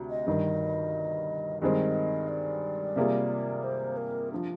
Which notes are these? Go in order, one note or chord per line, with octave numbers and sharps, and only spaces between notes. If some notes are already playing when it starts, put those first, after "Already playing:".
Already playing: D2 C3
D#5
G1 G2 D#3
G2 D#3 G#3 C4 D#5
D5
C3 G3 A#3 F4 G#4
C5
A#4
F3 D4